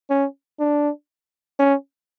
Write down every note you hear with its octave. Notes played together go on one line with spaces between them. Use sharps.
C#4
D4
C#4